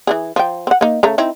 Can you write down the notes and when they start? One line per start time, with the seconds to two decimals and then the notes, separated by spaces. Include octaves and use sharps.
0.07 E3 G3 G#4
0.36 F3 G5
0.67 C4 F#5
0.81 A#3 D#4
1.03 C#3 A3 A#5
1.18 C4 D#4 E4